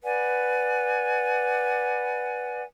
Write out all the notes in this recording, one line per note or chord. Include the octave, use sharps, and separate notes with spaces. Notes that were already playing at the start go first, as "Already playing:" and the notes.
B4 D5 F#5 G#5